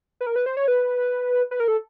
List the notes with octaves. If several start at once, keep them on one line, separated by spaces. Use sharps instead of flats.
B4
A#4
B4
C5
C#5
B4
B4
A#4
A4